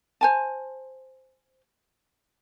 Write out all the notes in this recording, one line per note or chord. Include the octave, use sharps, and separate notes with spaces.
C5 G#5 A5